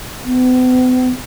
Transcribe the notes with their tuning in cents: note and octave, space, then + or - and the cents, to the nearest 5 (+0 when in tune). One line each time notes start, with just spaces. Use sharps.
B3 +45